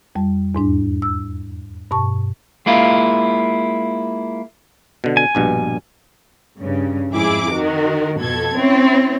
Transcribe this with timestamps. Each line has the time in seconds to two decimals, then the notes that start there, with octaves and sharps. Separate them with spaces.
0.15 F2 G3
0.55 E2 G#2 D4
1.02 E6
1.91 G2 B2 A5 C#6
2.66 G#3 A#3 E4 F4
5.04 B2 D3
5.17 G#5
5.35 A#1 G2 B2
6.59 G2 C#3
7.12 F2 G#2 E4 G#4 D6
7.52 D#3 F#4 A#4
8.19 F2 B2 A4 G#6
8.57 C4 C#4 E4 C#5